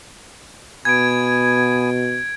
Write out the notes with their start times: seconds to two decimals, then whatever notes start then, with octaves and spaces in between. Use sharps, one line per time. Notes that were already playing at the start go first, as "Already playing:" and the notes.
0.85 B2 B3 G#5 G#6 D7